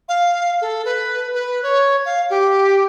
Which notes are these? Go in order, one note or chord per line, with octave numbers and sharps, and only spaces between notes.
F5
A4
B4
B4
C#5
F5
G4